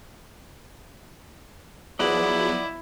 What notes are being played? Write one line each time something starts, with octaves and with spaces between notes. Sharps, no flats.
F3 F#3 B3 E4 G#4 D5 D#5 F#5